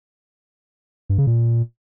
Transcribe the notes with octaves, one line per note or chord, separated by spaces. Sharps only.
G2
C#3
A#2